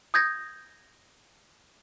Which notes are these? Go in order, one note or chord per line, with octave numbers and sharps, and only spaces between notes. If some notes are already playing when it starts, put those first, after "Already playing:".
D#6 G6 G#6 A#6